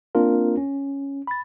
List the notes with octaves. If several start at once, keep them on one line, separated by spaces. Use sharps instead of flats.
A#3 C4 D4 F4 A#4
C#4
B5 A6